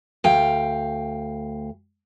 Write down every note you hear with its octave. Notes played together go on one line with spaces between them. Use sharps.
D2 F5 G5